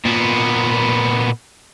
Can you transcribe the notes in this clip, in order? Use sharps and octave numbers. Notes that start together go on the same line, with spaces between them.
A#2 B3